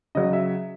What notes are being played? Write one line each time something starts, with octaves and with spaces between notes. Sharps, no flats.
C#3 F#3 D#5
E5